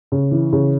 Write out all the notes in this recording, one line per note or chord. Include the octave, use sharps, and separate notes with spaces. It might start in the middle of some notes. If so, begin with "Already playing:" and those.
C#3
E3
C#3